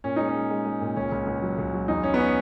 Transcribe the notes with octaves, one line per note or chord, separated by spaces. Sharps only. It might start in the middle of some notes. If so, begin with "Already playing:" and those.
A#2 C#4
G#3 D#4
C#4
G#3
G#3
G#3
A#2
C#2 C#4
C#2
C#2
F#3
C#2
F#3
E2 D#4
E2 C#4
B3
C#4